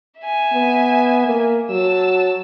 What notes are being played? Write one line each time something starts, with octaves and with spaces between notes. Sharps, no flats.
E5 G#5
B3
A#3
F#3 A5 E6